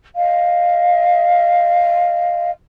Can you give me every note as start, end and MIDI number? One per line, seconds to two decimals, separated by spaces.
0.17 2.51 75
0.17 2.51 77